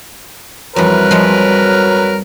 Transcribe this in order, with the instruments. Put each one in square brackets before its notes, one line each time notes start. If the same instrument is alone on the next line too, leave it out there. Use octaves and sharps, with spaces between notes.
[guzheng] F2 E3 [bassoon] F#3 [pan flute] G3 [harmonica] A#4 B4
[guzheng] F3 G#3 C#5